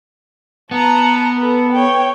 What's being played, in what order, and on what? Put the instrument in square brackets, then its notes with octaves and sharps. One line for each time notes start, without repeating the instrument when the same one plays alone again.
[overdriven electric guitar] B3 [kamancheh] A5 A#5
[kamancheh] A4 B4
C#5 G5